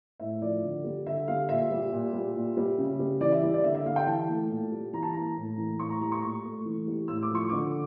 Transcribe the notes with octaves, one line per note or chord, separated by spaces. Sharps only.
A2 E5
F3 D5
D3
G3
D3 E5
G3 F5
A#2 E5
G3
A#2
G3
A#2
G3
C#3
G3
E3 D5
E5
G3
D5
D3 E5
E5
G3 F5
G5
E3 A5
A3
A#2
G3
E3 A#5
A5
A#3 A#5
A2
E3
A2 C#6
A#5
G3 A#5
C#6
A#2 C#6
A3
E3
G3
A2 E6
D6
F3 C#6
D3 D6